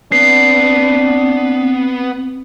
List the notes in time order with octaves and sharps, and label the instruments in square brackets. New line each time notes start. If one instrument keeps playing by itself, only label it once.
[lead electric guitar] B3 [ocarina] C4 [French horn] D4 [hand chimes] C7